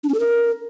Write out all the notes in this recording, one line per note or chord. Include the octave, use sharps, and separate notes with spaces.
D4
C#4
A4
A#4